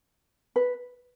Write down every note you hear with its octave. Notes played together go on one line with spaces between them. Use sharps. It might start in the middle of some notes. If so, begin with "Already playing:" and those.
B4